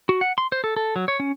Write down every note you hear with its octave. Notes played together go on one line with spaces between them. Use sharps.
F#4
F#5
C6
C5
A4
A4
F#3
C#5
C#4